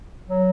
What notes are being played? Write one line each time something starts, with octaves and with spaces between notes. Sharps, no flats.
F#3